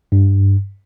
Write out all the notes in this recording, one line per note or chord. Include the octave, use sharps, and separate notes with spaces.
G2